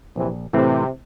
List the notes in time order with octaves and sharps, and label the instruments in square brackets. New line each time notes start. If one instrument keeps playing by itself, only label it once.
[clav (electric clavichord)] A#1 [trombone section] C3 E3
[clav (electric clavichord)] A2 E3 A3 C4 [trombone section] C3